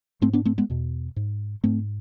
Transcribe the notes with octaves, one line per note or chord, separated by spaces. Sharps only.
G#2 A3 C4
B3 D4
A3 C4
G#3 B3
E2 B2
G#2
G#2 A3 C4